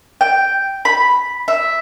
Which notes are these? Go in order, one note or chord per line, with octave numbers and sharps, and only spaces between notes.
G5
B5
E5